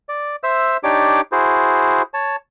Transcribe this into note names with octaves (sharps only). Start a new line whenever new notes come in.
D5
C5 E5 E6
D4 D#4 G4 C#5 D5 D6
E4 F#4 G#4 C5
C#5 A5